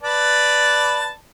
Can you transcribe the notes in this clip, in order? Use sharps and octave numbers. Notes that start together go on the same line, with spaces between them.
B4 D5 A5